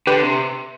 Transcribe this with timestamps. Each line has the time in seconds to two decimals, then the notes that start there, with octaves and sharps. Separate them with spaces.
0.07 D3 G4 B4
0.22 C3